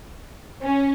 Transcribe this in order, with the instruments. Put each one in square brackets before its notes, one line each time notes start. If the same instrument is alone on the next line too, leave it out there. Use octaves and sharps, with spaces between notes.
[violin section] C#4